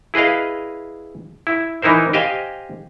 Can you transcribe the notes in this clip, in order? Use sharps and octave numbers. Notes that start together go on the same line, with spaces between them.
E4 G#4 B4 D#5 F5
E4
E3 D#4 E4 A#4 C5
G4 C5 D#5 F5 G#5